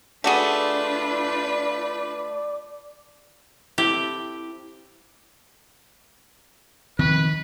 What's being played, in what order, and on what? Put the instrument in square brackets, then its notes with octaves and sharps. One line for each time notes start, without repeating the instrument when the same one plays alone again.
[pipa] A3 F#4 G#4 [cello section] D4 F4 [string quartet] B4 [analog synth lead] D5
[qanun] C4 E4 A4 [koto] G4
[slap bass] D#3 F3 C4 [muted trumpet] B4